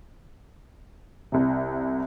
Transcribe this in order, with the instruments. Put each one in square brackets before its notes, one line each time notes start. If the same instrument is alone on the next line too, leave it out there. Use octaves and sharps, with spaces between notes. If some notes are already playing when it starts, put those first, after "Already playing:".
[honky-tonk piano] C2 C3